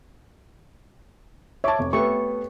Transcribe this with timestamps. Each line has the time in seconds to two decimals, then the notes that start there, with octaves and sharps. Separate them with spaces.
1.64 C#5 E5 A5 D6
1.79 F1
1.93 A3 B3 G4 A4 C#6